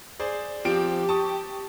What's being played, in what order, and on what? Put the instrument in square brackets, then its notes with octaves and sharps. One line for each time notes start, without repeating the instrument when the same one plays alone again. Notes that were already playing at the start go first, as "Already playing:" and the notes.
[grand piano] G#4 C5 D5
[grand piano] F3 C4 D7 [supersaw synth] G4
[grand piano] A5 C#6 D#6